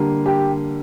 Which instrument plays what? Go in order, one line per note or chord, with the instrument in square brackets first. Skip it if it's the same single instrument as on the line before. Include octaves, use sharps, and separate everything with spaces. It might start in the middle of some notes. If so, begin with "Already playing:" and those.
Already playing: [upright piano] D3 G3 A#3
G4